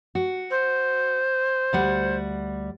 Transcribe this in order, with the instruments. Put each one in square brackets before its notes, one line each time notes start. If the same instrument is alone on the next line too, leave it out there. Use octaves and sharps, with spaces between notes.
[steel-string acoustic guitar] F#4
[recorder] C5
[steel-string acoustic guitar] D2 G3 F#5